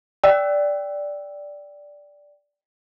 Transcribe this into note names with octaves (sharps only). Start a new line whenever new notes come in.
D5 G5 E6